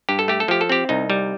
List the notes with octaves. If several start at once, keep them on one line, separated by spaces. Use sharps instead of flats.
G2 G4
A4
A3 G4
A4
F3 G4
A4
C4 G4
C2 D#4
G3